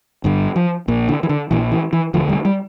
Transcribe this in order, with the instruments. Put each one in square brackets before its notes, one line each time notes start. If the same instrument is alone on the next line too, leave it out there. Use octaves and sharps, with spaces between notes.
[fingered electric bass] G1 G2 D3
F3
A#1 A#2
D3
E3
D3
A#1 A#2 E3
E3
E3
E1 D2 D3 F3
G3
G3